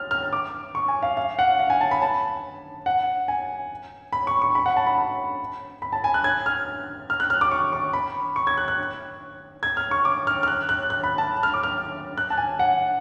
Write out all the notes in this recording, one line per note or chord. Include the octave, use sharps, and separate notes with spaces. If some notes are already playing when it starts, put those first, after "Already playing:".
Already playing: F6
F6
D6
C#6
G#5
F5
F5
F#5
F5
G#5
A5
B5
A5
F#5
G#5
B5
C#6
C#6
B5
F#5
A5
B5
B5
B5
A5
G#5
F#6
G#6
F6
F6
F#6
F6
D6
C#6
C#6
B5
C#6
G#6
F#6
F#6
G#6
F6
C#6
D6
F6
F6
F#6
F#6
F#6
B5
A5
F6
D6
F6
F#6
A5
G#5
F#5